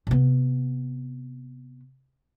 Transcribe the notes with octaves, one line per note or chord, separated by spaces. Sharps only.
C3 B3